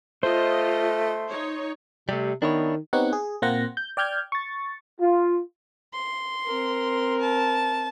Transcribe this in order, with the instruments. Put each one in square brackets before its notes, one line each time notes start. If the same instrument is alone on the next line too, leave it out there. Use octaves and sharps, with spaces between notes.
[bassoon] A3 [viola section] F4 D#5 [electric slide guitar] C5
[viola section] D#4 C#5
[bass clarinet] C3 [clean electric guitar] G3 A3
[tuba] D#3 [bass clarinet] B3 [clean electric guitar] D4 E4 C#5
[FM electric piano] B3 C4 D#4 G4 C#5 F#5
G#4
A#2 A#3 C4 C5 F#5 A#6
G6
D5 G5 F6 G6 G#6
C#6 A6
[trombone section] F4
[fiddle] C6
[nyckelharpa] C4 A#4
[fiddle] A5